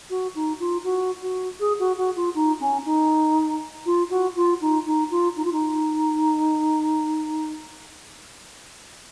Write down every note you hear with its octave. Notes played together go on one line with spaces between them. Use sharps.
F#4
D#4
F4
F#4
F#4
G#4
F#4
F#4
F4
D#4
C#4
D#4
F4
F#4
F4
D#4
D#4
F4
D#4
F4
D#4